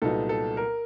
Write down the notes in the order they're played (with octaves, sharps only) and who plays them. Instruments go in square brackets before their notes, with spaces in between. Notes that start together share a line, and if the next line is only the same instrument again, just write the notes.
[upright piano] C2 A#2 F#3 B3 D#4 [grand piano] A4
[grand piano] A4
A#4